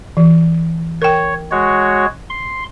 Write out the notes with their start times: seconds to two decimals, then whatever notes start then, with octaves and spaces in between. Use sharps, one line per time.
0.17 E3
1.02 A#4 C#5 G5
1.51 G#3 F#4 C#5
2.30 C6